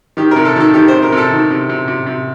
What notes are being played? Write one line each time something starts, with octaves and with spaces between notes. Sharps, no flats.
D#3 G4
C3 A#4
A4
D#3 A4
D#3 G4
C5
C3
A#4
C3 A4
D#3
C3
C3
C3
C3